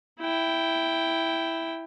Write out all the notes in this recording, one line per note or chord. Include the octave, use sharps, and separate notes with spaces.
E4 G5